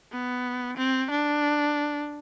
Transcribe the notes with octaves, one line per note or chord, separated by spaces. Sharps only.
B3
C4
D4